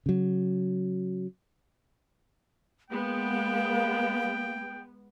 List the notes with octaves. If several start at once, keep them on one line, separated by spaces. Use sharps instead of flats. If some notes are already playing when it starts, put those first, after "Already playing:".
C#3 F#3
G#3 A#3 B3 G5